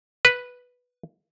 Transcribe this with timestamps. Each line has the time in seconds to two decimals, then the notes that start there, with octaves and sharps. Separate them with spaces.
0.25 B4